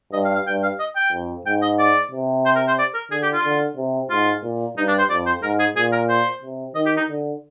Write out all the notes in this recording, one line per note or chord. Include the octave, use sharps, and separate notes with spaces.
G2 D#5
F5
F5
G2 G5
F5
D#5
G5
F2
G#2 G5
D#5
D5
C3
C5
A#4
C5
D5
A#4
D3 G#4
G4
F4
D3
C3
G#2 F4
A#2
G2 D#4
D4
C5
F2 D5
C5
G#2 A#4
G#4
A#2 G#4
A#4
C5
C3
D#3 D#5
G4
D#4
D3